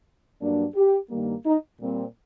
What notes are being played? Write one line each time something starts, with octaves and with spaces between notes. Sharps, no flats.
G2 F#3 A#3 D4
G4
G2 D#3 G3 A#3
D#4
A#2 G3 C4